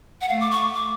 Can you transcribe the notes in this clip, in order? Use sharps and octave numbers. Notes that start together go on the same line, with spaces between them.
F#5
A3 F5
D6
C#6
D6